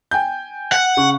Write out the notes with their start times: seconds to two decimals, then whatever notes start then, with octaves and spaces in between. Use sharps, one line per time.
0.11 G5 G#5 G6
0.72 F#5
0.97 C#3 C#6